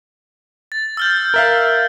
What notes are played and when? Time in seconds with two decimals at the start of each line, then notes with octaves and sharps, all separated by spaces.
0.72 A6
0.97 E6 F6 G6
1.34 A#4 E5 F5